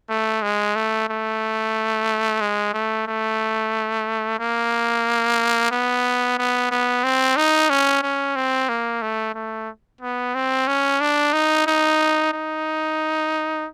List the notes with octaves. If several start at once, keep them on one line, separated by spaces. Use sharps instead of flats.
A3
G#3
A3
A3
G#3
A3
A3
A#3
B3
B3
B3
C4
D#4
C#4
C#4
C4
A#3
A3
A3
B3
C4
C#4
D4
D#4
D#4
D#4